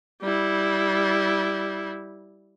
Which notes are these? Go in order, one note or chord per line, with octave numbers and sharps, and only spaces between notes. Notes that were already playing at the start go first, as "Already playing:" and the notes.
G3 E4